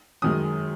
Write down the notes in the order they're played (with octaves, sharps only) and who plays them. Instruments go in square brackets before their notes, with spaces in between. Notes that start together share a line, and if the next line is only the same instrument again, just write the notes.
[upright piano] F#2 D#3 G#3 D#6